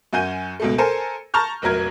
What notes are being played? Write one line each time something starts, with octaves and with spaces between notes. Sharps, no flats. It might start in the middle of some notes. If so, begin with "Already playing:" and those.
F#2 F#4 G#5 G6 D#7
C#2 B2 A3
A4 A#4 C5 G#5
A5 A#5 C#6 F6 G6
F1 A#1 F#3 A#4 G#6